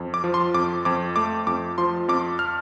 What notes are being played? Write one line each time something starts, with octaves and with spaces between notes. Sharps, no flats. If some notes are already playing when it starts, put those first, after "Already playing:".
Already playing: F2
D6
F3
C6
F2 D6
F2 D6
A3 D6
F2 D6
F3 C6
F2 D6
F6